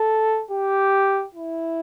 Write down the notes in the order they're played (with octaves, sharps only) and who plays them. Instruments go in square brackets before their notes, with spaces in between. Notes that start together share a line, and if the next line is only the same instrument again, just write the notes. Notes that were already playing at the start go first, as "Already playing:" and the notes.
Already playing: [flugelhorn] A4
G4
E4